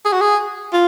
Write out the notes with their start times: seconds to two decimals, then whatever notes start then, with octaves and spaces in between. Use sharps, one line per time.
0.05 G#4
0.13 F#4
0.21 G#4
0.73 F4